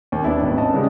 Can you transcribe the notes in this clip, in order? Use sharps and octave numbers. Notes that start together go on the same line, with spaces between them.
D#2
B3 D4 E4
G#1
C#4 D#5 A5
C#3 G3 G#3